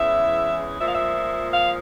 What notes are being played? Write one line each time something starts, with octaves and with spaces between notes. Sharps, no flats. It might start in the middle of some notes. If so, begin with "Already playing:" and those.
Already playing: E2 C#3 E3 G#3 E5
A#2 F3 G#3 E5
F5
E5
F5